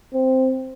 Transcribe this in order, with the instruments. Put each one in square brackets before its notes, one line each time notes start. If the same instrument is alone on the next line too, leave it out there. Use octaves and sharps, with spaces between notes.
[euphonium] C4